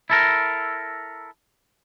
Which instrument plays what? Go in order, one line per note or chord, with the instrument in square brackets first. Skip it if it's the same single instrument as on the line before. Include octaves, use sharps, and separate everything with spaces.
[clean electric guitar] E4 A4 A#4